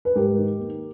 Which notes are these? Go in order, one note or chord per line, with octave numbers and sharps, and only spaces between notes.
B4
G#2 G4 A#4
D#3
A#3